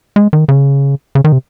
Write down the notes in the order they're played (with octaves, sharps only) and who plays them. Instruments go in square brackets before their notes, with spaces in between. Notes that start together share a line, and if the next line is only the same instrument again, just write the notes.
[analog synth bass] G#3
D#3
C#3
C#3
D#3
C3